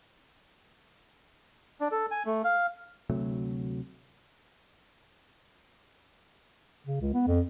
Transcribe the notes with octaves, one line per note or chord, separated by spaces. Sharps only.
D4
A4
G#5
A3
F5
D2 C3 F#3 A3
C#3
C#2
B3
F2